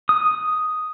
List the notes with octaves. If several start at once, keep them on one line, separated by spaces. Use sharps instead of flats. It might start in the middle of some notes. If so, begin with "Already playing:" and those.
D#6